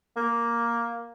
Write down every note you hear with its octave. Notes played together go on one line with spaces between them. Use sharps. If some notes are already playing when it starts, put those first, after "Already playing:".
A#3